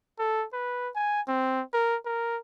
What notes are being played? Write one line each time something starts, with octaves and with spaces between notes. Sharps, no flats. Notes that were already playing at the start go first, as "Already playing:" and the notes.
A4
B4
G#5
C4
A#4
A#4